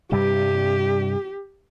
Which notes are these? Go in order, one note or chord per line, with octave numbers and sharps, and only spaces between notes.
G2 C3 G3 G4